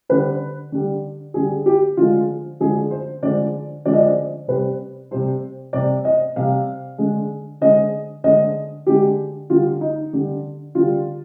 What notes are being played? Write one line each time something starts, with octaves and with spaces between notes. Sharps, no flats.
D3 G3 B4
D3 G3
D3 G3 G#4
G4
D3 F3 G#3 F4
D3 F3 G#3 G#4
C5
D3 F3 G#3 D5
D3 F3 G#3 D5
D#5
D5
C3 G3 B4
C3 G3 C5
C3 G3 D5
D#5
C3 G3 F5
D3 G#3
D3 G#3 D#5
D3 G#3 D#5
D3 G#3 G4
D3 G3 F4
D#4
D3 G3
D3 G3 F4